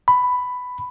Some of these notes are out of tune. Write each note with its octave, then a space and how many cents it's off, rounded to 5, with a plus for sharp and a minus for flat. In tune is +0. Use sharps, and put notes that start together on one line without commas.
B5 +10